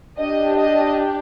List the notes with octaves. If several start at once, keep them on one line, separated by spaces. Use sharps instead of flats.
D4 G4 D#5
D#5